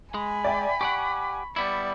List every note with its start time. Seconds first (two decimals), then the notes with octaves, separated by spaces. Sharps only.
0.14 G#3 G#5 B5
0.44 D5 E5 G5
0.81 G4 D5 F#5 C#6
1.56 G3 B3 E4 D5